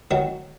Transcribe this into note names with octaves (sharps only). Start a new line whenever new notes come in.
D#3 F#3